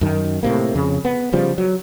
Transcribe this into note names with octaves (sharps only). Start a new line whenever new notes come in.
F#2 D#3
A2 C3 A#3
F2 C#3
B3
C#3 F3 G3
F#3